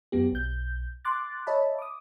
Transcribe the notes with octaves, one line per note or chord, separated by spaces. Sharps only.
F#2 F#3 B3 G4
B1 G6
C6 D6 F#6 A6
C#5 D#5 E5 A5 B5
D6 D#6